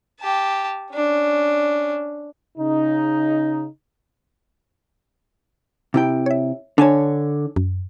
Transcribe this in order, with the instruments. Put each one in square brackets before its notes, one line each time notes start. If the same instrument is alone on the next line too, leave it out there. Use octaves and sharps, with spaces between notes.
[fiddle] G4 A5
C#4 D4
[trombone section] C#3 D#4
[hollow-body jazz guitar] C3 E4 G5
[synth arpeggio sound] C#5 E5
[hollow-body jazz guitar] D3 C#5 [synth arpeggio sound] D4 G#5 A5
[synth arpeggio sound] F#2